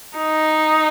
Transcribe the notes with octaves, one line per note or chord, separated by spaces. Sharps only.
D#4